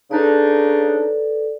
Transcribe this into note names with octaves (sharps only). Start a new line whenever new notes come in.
C#3 D4 D#4 A4 B4 D5